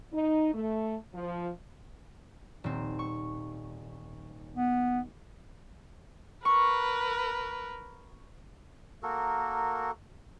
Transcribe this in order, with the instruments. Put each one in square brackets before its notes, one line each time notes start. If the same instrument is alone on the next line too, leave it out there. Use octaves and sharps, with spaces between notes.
[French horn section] D#4
A3
F3
[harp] D#1 C4
C#6
[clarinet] B3
[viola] A#4 B4 [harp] C#6
[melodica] A#3 F#4 A4 A#4